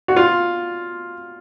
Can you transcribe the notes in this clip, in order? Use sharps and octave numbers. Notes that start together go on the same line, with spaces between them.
F#4
F4